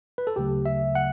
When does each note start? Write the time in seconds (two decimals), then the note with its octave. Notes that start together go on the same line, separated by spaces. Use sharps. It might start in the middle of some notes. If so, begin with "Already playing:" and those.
0.18 B4
0.27 A4
0.36 D2 C#3 F#3 A3 G4
0.66 E5
0.95 F#5